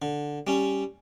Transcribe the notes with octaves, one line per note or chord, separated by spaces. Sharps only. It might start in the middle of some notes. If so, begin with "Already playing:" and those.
D3
G3 C#4